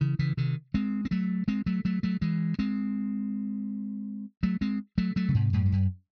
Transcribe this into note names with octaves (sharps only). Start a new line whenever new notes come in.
C#3 E3
C#3 E3
C3 D#3
G#3 C4
C4
F#3 A3
G#3 C4
F#3 A3
F#3 A3
F#3 A3
E3 G#3
G#3 C4
F#3 A3
G#3 C4
F#3 A3
F#3 A3
C#3
G#2 C3
F#2 A2
G#2
F#2